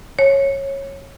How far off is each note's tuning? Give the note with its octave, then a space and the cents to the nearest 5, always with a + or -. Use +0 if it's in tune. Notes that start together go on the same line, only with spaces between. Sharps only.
C#5 -15